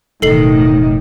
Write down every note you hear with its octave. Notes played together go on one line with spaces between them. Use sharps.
E1 F2 A2 D#3 D#4 A4 C7 F#7